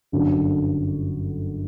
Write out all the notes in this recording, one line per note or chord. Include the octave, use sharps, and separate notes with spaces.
G1 F#2 D3 F#3